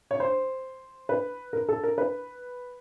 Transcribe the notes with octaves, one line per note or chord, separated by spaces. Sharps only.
C#5
C5
B4
A#4
A4
A#4
B4